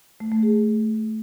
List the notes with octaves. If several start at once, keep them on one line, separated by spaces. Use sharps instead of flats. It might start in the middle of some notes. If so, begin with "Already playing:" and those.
A3
A3
G#4